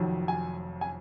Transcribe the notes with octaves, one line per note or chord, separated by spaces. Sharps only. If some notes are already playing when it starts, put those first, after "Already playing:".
Already playing: F1 F2 D#3 F#3
G#5
G#5